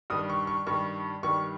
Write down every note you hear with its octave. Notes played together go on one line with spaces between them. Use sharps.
G2 D#3 G3 D#6
C#6
C#6
G2 D#3 G3 C#6
G2 D#3 G3 C#6